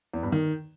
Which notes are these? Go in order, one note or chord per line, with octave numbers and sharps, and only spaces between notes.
E2
G2
D#3